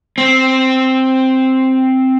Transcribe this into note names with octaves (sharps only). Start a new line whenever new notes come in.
C4